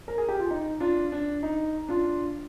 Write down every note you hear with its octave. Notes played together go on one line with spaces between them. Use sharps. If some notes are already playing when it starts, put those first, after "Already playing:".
A#4
G#4
G4
F4
D#4
D4 F4
D4
D#4
D4 F4